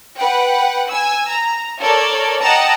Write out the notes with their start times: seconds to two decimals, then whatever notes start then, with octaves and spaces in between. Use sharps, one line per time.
0.18 B4 F#5 G5
0.90 G#5 E6
1.32 A#5
1.80 A4 A#4 C#5 D5
2.42 D#5 F#5 G5 A5 A#5 E6